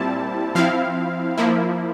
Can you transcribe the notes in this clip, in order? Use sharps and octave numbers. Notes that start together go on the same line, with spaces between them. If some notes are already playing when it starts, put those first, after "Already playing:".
Already playing: A#2 G3 C4 E4 A5
F3 C4 E4 F5
F3 A#3 E4